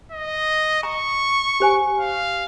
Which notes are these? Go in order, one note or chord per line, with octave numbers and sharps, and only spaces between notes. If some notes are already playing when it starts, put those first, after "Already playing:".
D#5
A#5 C#6
G4 C5 G#5
F5